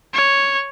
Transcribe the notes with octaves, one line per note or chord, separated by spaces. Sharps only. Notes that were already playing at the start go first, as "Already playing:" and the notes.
C#5